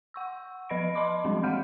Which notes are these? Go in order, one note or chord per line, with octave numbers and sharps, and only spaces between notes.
F#5 C#6 E6
F3 B4 D#5 B5 A#6 D7
D#5 A5 B5 C6 D6
F3 G3 G#3 C4 D4
E3 F5 F#5 F6 G6